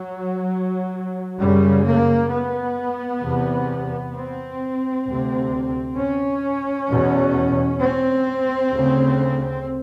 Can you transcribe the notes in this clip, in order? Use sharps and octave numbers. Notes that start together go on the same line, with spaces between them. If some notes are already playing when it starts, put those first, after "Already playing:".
Already playing: F#3
F#2 C#3 G3
A#3
B3
E2 C3
C4
D2 C3
C#4
E2 B2
C4
D2 C#3